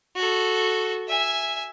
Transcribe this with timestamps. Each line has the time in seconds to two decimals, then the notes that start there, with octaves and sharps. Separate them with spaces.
0.16 F#4 A4
1.08 E5 G#5